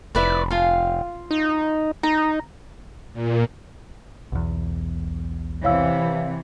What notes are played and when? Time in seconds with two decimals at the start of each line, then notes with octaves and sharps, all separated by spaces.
0.15 F1 E4 B4 D5
0.51 F4 F5
1.31 D#4
2.03 D#4 A#5
3.13 A#2
4.32 B1 E2
5.64 C3 E3 C#5 F5 E6